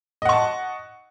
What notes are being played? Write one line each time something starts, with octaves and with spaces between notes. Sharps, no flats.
D#5 F#5 A5 C#6